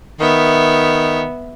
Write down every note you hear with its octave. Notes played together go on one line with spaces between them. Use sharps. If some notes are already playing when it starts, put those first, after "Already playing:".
D#3 B3 E5